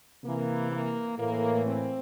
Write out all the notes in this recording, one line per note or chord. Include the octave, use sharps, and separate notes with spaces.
C3 E3 A#3
A#3
A2 E3 A#3
C4